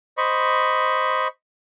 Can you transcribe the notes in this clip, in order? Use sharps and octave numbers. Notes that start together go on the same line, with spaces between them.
C5 D#5 B5 C#6